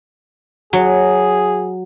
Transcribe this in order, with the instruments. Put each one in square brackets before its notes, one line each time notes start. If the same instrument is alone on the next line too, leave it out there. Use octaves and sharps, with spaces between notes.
[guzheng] F#3 [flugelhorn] G#4